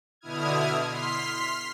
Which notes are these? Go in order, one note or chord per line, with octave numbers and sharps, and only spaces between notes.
B2 D3 E4 D#6 F6 G#6
C6 F6 B6 C7